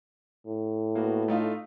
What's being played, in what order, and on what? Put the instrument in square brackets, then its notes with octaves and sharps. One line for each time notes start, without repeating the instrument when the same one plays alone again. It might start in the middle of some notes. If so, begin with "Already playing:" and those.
[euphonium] A2
[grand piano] A#3 B3 F#4
A3 D#4 F4